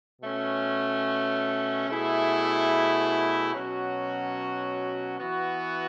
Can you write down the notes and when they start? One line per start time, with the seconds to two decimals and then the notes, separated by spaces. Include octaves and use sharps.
0.21 B2 A3 C#4
1.87 B2 A3 E4 G#4
3.52 B2 F#3 C#4 F#4
5.18 E3 B3 F#4